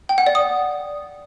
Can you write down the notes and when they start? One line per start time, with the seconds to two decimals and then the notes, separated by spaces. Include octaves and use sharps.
0.09 G5
0.18 F#5
0.26 D5
0.35 D#6